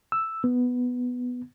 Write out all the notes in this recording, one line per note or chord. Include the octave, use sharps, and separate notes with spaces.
E6
B3